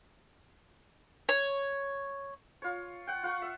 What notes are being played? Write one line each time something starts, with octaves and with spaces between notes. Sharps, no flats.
C#5
F4 C#5
F#5 G5
F4 F#5 C#6
E5